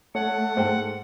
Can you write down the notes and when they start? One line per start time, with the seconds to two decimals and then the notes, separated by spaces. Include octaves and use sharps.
0.15 A3 C#5 F#5
0.56 G#2 C5 G5